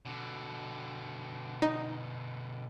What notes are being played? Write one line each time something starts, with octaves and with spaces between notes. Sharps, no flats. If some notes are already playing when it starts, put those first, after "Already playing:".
B2 D3
D#4